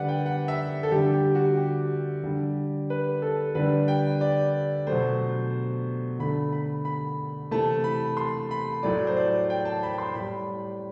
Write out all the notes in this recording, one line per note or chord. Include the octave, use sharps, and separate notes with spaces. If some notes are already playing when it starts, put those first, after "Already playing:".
Already playing: D3 G3 B4 D5 F#5
G5
F#5
E5
A4
D3 G3 G4
G4
F#4
G4
D3 G3
B4
A4
D3 G3 B4
G5
D5
B2 F#3 A3 C5
D3 A3 B5
B5
B5
C3 E3 A3 A5
B5
C6
B5
A2 F#3 A3 D5
C5
D5
G5
A5
B5
C6
A2 G3 B5